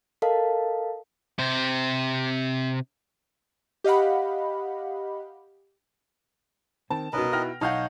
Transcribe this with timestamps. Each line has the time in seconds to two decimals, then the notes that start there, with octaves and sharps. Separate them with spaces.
0.22 A4 A#4 D#5 F5 A5
1.39 C3 C5
3.84 G4 D#5 F5 F#5 B5
6.90 D#3 C4 A5
7.13 C2 B2 C#4 D#4 A#4 B4 D#5
7.33 D#4 E4 F#4 G5 F6 A#6
7.61 B1 D#4 C#5 F5 F#5 A5 F6 G6